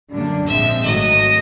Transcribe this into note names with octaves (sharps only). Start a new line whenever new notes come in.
F#2 D3 G3 A#3 D4
A#1 G#2 F3 G#3 C4 E5
G#1 G#2 D#3 F#3 A3 D#5